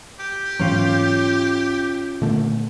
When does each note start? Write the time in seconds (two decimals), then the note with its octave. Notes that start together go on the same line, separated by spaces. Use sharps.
0.19 G4
0.59 G#2 E3 F#3 C#4 F4 G5
2.22 A#2 D3 A3